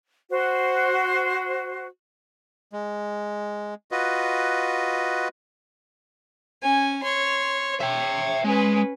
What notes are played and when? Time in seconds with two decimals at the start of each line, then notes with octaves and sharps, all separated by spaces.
0.30 F#4 C5
2.73 G#3
3.91 F4 F#4 B4 D#5
6.62 C#4 G#5
7.03 C#5 C6
7.80 C#5 E5 G5
8.45 G#3 C#4 B4